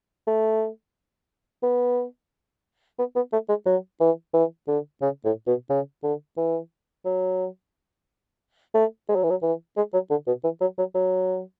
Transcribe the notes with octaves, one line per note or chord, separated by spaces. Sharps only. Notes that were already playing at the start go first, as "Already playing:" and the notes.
A3
B3
B3
B3
A3
G#3
F#3
E3
E3
D3
C#3
A2
B2
C#3
D3
E3
F#3
A3
G#3
F#3
E3
F#3
E3
G#3
F#3
D3
B2
E3
F#3
F#3
F#3